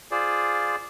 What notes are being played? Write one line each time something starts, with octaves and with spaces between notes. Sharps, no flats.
F4 G#4 C5 D5